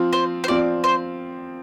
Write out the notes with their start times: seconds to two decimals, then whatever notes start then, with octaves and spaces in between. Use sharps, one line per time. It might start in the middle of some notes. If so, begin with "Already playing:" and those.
Already playing: F3 C4 F4
0.13 C5
0.44 C5
0.48 F3 C4 F4 D5
0.84 C5